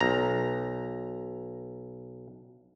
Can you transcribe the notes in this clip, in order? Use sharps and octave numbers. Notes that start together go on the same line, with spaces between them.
B1 A#5